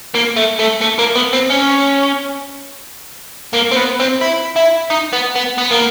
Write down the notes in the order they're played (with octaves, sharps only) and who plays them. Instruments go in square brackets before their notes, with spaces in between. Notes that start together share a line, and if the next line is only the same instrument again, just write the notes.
[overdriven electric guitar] A#3
A3
A3
A3
A#3
B3
C4
C#4
A#3
C4
B3
C4
E4
E4
D#4
B3
B3
B3
A#3